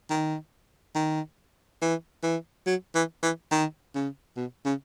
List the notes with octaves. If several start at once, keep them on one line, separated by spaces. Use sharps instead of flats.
D#3
D#3
E3
E3
F#3
E3
E3
D#3
C#3
B2
C#3